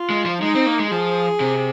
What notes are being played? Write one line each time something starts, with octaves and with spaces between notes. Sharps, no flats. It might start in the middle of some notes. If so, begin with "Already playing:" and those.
Already playing: F4
G#3
F3
G#3 D#4
C4
A#3
G#3
F3 G#4
C3